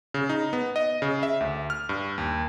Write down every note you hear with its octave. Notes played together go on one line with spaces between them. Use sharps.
C#3
D#4
B3
D#5
C#3
E5
D2
F6
G2
D#2